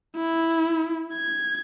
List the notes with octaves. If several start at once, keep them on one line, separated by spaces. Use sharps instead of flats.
E4
G#6